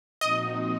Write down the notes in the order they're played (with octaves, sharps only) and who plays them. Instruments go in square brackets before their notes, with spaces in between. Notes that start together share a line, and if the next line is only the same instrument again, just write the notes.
[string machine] A#2 F3 C4 D#4 F#4 [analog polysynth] D#5